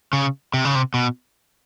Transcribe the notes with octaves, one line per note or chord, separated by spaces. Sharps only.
C#3
C3
C#3
C3
B2